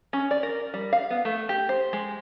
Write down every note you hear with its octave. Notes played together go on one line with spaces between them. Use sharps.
C#4
D5
A#4
G3
F5
B3
A3
G4
C5
G#3